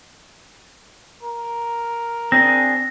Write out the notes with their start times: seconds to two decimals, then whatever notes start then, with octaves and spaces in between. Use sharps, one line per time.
1.23 A#4
2.32 C4 D4 G#4 A#6